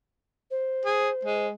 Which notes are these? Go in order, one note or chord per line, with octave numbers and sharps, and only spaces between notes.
C5
G#4
G#3